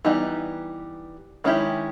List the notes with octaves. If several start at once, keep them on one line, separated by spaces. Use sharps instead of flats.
E3 G3 B3 D#4 G4
D#3 G#3 C#4 E4 G4